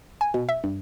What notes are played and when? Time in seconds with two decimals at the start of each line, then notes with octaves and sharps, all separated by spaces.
0.21 G#5
0.34 B2
0.49 E5
0.64 G2